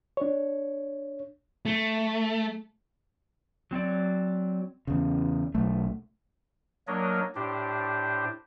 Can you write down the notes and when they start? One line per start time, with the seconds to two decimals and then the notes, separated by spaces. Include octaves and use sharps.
0.17 D4 C#5
1.66 A3
3.71 F#3 C4 C#5 D5
4.87 E2 C#3
5.54 B1 A3
6.87 F#3 A#3 D4 A#4 C#5 D#5
7.36 A2 D4 G4 C5